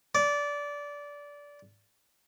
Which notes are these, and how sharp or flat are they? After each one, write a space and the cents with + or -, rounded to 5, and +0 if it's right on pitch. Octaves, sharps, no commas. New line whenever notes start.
D5 -20